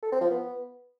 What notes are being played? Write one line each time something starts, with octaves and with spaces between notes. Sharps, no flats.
A4
C4
F3
B3